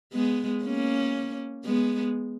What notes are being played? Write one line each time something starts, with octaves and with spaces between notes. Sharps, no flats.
G#3 B3
A#3 C#4
G#3 B3